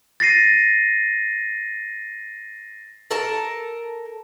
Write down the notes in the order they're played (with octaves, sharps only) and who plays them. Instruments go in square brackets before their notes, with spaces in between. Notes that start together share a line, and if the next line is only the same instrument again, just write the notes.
[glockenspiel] A6 A#6 C7 D#7
[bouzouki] A4 A#4 A5